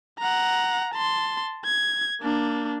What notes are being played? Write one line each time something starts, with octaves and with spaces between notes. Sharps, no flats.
F#5 A#5
A5 C6
G#6
A#3 D4